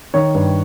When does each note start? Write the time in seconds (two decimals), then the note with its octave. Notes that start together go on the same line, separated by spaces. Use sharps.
0.14 D#3 C#5
0.35 G2